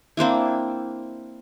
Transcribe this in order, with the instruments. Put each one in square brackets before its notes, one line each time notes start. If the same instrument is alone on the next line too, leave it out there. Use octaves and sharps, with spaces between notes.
[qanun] A#3 C4 D4 E4